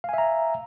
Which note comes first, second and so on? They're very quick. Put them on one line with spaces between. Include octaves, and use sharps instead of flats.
F5 G#5 E5 A#5